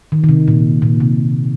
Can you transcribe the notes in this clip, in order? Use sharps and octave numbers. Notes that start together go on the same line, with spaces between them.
D#3
D#3
C3
A#2
A#2
C3